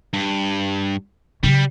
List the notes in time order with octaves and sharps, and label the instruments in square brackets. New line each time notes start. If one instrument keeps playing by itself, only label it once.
[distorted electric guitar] G2
[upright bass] C#3 F#3 [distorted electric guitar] G3